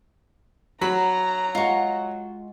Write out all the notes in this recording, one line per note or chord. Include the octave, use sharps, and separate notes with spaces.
F#3 A#5 B5
G#3 F4 F#5 C#6